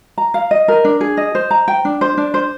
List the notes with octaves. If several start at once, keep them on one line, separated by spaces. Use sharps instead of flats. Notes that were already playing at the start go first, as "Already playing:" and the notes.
A#5
F5
D#5
A#4
D4
G#4
D#5
C5
A#5
G5
D4
C5
D4
C5